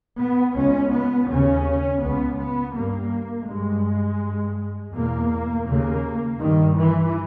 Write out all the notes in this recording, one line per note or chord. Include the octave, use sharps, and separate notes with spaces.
B3
C#2 C#3 C#4
B3
D#2 C#3 C#4
C#2 C#3 B3
B3
G2 A#3
G2 G#3
G2
E2 B2 A#3
D#2 C#3 A#3
G2 D#3
E3